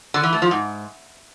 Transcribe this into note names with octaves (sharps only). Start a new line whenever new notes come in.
D3
E3
A3
F3
G#2